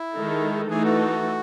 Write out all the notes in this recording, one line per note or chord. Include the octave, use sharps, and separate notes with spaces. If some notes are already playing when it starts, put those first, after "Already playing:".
Already playing: E4
D#3 G#3 D#4 A4
E3 A3 D#4 G#4 A4
F#4